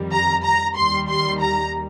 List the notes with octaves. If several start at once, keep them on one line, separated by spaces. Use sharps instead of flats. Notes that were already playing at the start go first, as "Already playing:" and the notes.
Already playing: F2 D#3 G3
A#5
A#5
D#2 D#3 G3 C6
C6
A#5